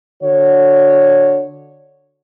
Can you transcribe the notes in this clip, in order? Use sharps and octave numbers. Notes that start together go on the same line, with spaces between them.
D3 F#4 C#5